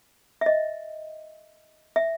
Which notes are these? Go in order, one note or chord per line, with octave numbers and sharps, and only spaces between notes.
E5
D#5
E5